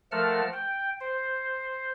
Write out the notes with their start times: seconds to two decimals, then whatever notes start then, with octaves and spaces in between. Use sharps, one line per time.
0.12 F3 A3 A#4 F#5 A5 F6
0.53 G5
1.00 C5